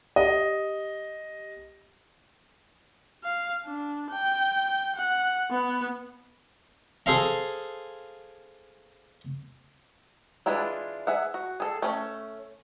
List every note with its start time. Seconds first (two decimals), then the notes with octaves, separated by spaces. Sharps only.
0.16 G4 D#5
3.24 F5
3.65 D4
4.12 G5
4.96 F#5
5.51 B3
7.06 G#4 A4 C5 F5 A#5
10.46 E3 G#3 D4 E4 F4
11.07 G#4 E5 F#5
11.34 F#4
11.60 G#4 A4
11.82 A3 C#4